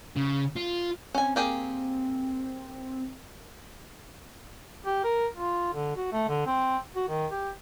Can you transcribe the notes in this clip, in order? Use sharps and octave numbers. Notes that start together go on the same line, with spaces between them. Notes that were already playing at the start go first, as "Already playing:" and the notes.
C#3
F4
C4 C#4 G#5
A#3 G4 G#4
G4
A#4
F4
D3
F#4
A3
D3
C4
F#4
D#3
G4